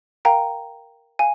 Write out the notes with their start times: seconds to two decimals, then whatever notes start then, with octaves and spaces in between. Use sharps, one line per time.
0.25 A#4 F5 G5 A#5
1.19 F5 G#5